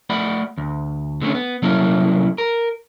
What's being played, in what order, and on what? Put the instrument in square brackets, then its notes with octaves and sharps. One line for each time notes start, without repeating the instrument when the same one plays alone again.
[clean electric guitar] A3 D5 F#5 B5
D2
D3 A3 C4 C#4
B3
C2 F#3 A#3 C#4 E4 A4
A#4